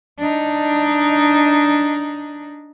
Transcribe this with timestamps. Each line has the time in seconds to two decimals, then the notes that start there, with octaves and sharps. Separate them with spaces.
0.18 D4 D#4